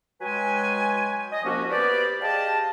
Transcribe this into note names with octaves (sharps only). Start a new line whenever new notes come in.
F#3 G#3 B4 G5 G#5
D#5
C2 F3 A#3 C#4 F#4
B3 G4 B4 C5 D5
G4 G#4 D5 D#5 F5 A5